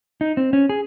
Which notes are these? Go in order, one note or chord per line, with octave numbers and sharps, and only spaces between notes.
D#4
C4
C#4
G#4